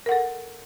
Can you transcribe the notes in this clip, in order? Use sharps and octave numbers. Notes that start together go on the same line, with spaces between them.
A4 A#4 F#5